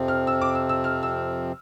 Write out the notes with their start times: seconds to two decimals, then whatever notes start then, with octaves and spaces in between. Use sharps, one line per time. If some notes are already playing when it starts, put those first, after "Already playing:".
Already playing: F2 C3 F3 C4
0.08 F6
0.27 E6
0.41 D6
0.55 E6
0.69 E6
0.84 F6
1.03 E6